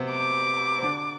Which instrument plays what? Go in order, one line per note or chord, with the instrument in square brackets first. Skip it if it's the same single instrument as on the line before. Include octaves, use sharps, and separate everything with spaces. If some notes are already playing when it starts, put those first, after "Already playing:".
Already playing: [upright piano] C3 B3 C4
[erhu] D6
[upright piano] C4
D3 D4